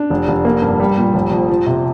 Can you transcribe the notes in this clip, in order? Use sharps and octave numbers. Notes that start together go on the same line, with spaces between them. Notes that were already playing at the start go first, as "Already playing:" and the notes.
Already playing: D4
F1
F1
A#3
G2
G3
A#2
F1
F2
F3
C3